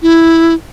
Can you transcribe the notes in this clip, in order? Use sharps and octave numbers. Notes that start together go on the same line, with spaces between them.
E4